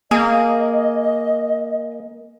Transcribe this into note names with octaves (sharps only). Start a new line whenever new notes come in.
A#3 G#4 D#5